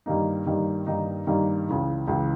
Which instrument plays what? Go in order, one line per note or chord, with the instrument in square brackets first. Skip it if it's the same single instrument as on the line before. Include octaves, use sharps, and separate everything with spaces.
[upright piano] G2 D#3 G3 A#3 D#4
G2 D#3 G3 A#3 D#4
G2 D#3 G3 A#3 D#4
G2 D#3 G3 A#3 D#4
C#2 C#3 E3
C#2 C#3 E3